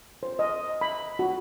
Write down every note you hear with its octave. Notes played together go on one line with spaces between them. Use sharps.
C5
D#5
B5
F#4